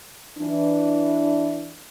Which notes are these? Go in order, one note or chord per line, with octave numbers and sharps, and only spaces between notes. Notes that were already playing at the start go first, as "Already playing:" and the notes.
E3 D4